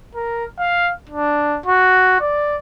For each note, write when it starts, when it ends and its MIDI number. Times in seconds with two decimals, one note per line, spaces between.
0.15 0.44 70
0.59 0.90 77
1.09 1.58 62
1.66 2.20 66
2.20 2.57 74